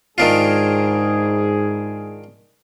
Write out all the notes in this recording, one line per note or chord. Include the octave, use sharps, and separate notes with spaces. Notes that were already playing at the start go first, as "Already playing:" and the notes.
G#2 D#3 D4 F4 G#4